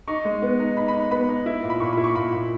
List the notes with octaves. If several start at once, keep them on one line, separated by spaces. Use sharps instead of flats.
D#4 C#6
G#3
B3
D#4
D#4 B5
B5
D#4
B3 B5
D#4
E4
A#2
B5
A#2 C#6
B5
E4
C#6
A#2 B5
A#2